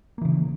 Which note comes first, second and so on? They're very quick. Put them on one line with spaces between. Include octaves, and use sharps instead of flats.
A#3 E3 C#3